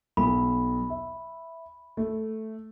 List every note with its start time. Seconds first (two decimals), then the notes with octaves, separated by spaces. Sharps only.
0.17 B1 B5
0.90 E5
1.97 A3